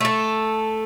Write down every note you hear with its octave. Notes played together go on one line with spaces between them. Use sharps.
A3 A4